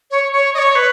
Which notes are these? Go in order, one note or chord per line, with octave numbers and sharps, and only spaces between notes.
C#5
C#5
D#5
C#5
B4